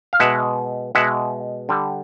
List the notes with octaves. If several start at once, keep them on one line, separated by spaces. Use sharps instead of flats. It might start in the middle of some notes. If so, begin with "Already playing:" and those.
F5
B2 G#3 E5 F#5
B2 G#3 E5 F#5
D3 G3